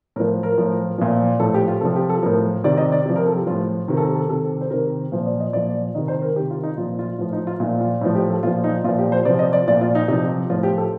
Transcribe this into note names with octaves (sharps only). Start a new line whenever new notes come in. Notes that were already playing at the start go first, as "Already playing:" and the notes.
A2 F3 A#4
A#4
A2 F3
A#2 F3
A2 F3 A4
G4
F4
C3 F3 A4
G4
A4
A2 F3 A#4
C3 D#3 D5
D#5
D5
C3 F3
A#4
A4
G4
A2 F3 F4
C3 D#3 A#4
A4
G4
A4
C3 D#3 A4
C5
C3 D#3 A#4
A#2 F3 C5
D5
D#5
A#2 F3 D5
C3 D#3 D#5
C5
A#4
C3 D#3 G4
F4
D#4
A#2 F3 F4
F4
A2 F3 F4
D#4
F4
A#2 F3 D#4
F4
A2 F3 D#4
G4
A4
A#2 F3 F4
D#4
A#2 F3 F4
G4
C5
C3 F3 D5
D#5
D5
A#2 F3 D5
F4
D#4
C3 F3 D#4
A2 F3 F4
G4
A4